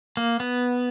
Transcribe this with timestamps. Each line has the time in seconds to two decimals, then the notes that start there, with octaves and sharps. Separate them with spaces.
0.17 A#3
0.40 B3